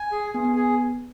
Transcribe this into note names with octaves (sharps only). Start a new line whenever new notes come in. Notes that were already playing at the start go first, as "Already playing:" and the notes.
Already playing: G#5
G#4
B3 G#4
B3
G#4